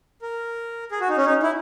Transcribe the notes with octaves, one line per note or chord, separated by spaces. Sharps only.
A#4
G#4
F#4
D#4
C#4
D#4
E4